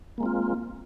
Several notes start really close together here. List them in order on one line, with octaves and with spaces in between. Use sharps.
A#3 G#3 C4 F4